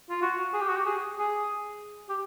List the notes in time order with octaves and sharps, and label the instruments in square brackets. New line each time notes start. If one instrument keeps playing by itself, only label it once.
[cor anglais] F4
F#4
G#4
G4
F#4
G4
G#4
G#4
G4